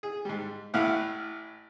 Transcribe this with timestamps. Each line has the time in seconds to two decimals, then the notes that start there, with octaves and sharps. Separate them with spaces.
0.03 G#4
0.25 G#2 G3
0.74 A1 A2 E4 F5 F#5